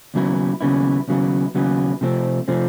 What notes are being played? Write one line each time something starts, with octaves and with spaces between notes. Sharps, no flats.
D#2 C#3 F#3 B3 E4
D#2 C#3 F#3 B3 E4
D#2 C#3 F#3 B3 E4
D#2 C#3 F#3 B3 E4
C3 F3 A3 C4
C3 F3 A3 C4